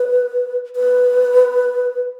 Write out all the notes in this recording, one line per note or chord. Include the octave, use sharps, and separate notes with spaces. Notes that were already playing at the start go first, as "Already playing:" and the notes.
Already playing: B4
B4